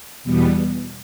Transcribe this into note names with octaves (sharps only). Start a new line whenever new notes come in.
E2 B2 G3 B3